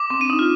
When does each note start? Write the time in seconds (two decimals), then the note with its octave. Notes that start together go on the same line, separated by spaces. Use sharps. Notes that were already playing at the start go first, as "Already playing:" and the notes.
Already playing: D6
0.10 C4
0.20 D4 D#7
0.30 D#4
0.39 F4